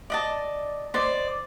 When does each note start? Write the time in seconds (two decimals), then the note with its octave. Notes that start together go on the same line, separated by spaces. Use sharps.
0.10 D5 D#5 A5
0.94 C5 D5 D#5